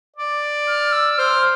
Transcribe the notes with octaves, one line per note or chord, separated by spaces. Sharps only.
D5
F6
E6
C5 F6